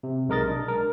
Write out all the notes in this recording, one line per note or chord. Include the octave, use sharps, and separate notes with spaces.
C3
B1 G#3 A#4 D#5 A6
D4
A#4